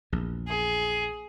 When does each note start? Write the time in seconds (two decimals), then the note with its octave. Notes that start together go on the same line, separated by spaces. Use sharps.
0.12 A#1 E2
0.47 G#4